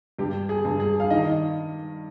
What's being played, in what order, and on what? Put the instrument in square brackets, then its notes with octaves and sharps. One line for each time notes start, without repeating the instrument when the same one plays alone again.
[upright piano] G2 G4
G#4
G2
G#4
F5
D#3 D#5